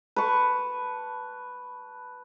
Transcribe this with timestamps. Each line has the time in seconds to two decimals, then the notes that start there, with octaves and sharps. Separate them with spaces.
0.16 B4 A5 C#6